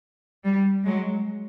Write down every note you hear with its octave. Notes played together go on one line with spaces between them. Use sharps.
G3
F#3 G#3